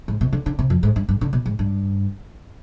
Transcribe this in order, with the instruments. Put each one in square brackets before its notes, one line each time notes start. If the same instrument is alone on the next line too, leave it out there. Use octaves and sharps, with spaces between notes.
[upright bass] G#2
B2
D3
D3
C3
F2
G#2
G2
G2
D3
B2
G#2
G2